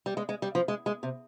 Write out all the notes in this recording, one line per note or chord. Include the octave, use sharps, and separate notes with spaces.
G3
G#3
G#3
G3
F3
G#3
G#3
C3